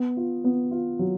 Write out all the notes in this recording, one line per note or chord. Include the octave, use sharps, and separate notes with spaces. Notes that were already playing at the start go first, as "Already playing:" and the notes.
Already playing: B3
F4
B3
F4
F#3